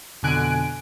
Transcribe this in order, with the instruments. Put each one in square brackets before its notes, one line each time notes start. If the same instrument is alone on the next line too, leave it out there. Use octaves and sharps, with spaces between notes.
[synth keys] F2 B2 D3 G#5 F#6 D7